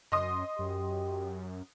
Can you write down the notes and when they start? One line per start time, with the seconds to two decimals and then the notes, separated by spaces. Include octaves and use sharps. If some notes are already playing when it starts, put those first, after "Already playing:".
0.12 F#2 D#5 C6 D#6
0.59 F#2 G4